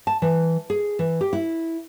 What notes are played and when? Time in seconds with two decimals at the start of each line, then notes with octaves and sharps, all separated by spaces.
0.07 A5
0.22 E3
0.70 G#4
0.99 E3
1.21 G4
1.33 E4